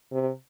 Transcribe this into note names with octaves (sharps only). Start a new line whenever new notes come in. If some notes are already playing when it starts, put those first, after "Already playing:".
C3